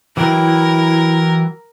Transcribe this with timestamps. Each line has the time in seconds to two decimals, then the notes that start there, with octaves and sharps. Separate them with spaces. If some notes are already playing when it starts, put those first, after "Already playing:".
0.17 E3 F#3 E4 A#4 G5